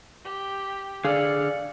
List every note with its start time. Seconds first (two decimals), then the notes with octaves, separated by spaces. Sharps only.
0.25 G4
1.04 D3 G#4 D5 F5 C#7